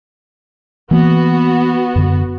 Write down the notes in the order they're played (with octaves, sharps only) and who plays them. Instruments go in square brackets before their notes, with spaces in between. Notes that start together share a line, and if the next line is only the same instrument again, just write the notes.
[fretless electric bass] E3 A#3 [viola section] B3 F#4
[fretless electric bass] F#2 D3